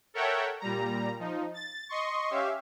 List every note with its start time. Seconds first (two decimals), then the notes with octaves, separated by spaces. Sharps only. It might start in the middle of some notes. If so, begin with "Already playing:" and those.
0.14 A4 A#4 C#5 E5 F#5 G5
0.60 A#2 G3 A#5
1.19 F3 D#4
1.54 A6
1.89 D#5 C6 C#6
2.31 C#4 G4 E5 F5